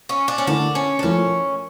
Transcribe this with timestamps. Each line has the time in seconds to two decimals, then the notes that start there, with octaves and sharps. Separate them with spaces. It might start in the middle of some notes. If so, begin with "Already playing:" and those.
0.09 C#4
0.28 D4
0.38 C#4
0.47 D3 A3 D4 E4 A#4
0.75 C#4
0.99 D4
1.03 F3 A3 C#4 E4 A#4